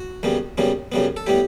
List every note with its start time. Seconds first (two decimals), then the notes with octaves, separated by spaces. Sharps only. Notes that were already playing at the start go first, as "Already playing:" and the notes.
Already playing: F#4
0.23 F#2 C#3 G3 B3
0.58 F#2 C#3 G3 B3
0.92 F#2 C#3 G3 B3
1.17 A4
1.26 A2 G3 B3 G4